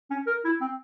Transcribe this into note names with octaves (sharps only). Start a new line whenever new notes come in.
C#4
A#4
E4
C4